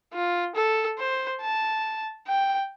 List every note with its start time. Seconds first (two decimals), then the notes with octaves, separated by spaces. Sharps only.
0.14 F4
0.56 A4
0.99 C5
1.41 A5
2.27 G5